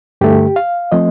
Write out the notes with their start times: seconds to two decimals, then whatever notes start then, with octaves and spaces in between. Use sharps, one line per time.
0.21 G2 D3 A3 G4
0.56 F5
0.92 F3 A3 C4 D#5